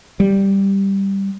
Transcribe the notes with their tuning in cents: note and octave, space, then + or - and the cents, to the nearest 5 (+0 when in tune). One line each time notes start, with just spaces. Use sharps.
G3 +0